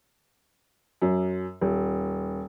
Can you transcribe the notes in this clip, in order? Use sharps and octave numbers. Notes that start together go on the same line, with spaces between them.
F#2
D#1